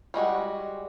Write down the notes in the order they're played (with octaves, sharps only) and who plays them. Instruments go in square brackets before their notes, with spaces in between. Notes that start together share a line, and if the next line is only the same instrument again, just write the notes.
[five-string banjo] G3 G#3 F#4 F#5